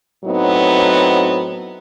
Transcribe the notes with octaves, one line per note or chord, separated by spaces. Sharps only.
A2 F#3 B3 C4 D#4